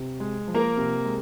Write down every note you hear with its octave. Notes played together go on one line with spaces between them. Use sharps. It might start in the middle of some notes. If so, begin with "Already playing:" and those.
Already playing: C3
G#3
F3
A#3 A#4
C3
G#3